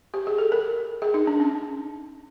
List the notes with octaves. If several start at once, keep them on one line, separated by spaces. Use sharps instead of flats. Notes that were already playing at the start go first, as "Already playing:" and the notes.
G4
G#4
A4
A#4
G#4
D#4
D4
C#4